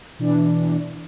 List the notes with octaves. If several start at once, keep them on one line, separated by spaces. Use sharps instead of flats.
B2 E3 D4